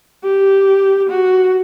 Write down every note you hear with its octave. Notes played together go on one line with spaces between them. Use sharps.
G4
F#4